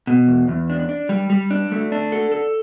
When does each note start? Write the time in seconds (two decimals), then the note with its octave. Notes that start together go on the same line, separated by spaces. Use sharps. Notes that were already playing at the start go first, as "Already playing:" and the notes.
0.07 B2
0.28 E2
0.48 E2
0.70 D4
0.89 D4
1.09 G3
1.30 G3
1.51 D4
1.72 A3
1.92 D4
2.12 A4
2.32 A4